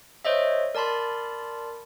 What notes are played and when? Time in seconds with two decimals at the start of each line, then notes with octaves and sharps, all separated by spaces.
0.25 C5 C#5 D#5 E5
0.75 A#4 D5 A5 B5 C6